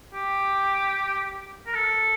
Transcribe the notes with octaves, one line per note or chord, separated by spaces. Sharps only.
G4
A#4
A4